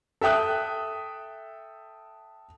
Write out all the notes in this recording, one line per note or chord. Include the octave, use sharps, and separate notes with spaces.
A4 E5 G5 D#6 F#6